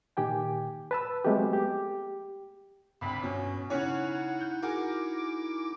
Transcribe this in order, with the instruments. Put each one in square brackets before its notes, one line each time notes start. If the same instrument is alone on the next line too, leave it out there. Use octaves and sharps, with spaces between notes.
[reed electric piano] A#2 D#3 G4 G5 G#5
B4 A5 E6
F#3 G#3 A3 B3 C4 G4
G4
[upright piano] G#1 D2 [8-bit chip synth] G5 D6 [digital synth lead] B5
[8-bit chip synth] G2 [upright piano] B2 [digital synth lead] C#4
[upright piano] C#3 C#4 C#5 [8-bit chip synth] D#4 E4 [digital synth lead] F#5
[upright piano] G6
[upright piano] F#4 G#4 A#4 [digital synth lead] D6